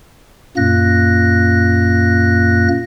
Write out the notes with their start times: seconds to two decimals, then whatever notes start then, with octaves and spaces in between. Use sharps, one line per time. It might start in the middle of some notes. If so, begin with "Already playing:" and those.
0.57 F#2 A#2 A#3 F#6 A#6